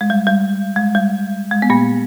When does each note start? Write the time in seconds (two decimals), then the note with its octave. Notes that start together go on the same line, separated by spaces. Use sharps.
0.01 G#3
0.10 G3
0.27 G3
0.76 G#3
0.95 G3
1.51 G#3
1.62 B3
1.70 A#2 A#3